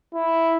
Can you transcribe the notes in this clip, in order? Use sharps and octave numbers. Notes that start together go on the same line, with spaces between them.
E4